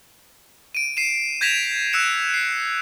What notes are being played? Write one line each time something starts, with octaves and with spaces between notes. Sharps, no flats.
D7 D#7
C7 D#7 E7
G6 G#6 A#6 B6 E7 F7
E6 F#6 C#7 E7
C7